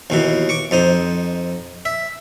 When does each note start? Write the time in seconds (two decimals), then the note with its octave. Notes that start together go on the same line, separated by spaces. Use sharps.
0.10 D#2 B2 E3
0.49 C#6 D6
0.71 F2 D#4 C5
1.85 E5